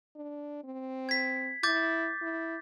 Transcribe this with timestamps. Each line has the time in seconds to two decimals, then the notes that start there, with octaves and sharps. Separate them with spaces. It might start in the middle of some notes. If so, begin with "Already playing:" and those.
0.16 D4
0.64 C4
1.09 G#6 B6
1.63 E4 D6 G6 A6
2.22 E4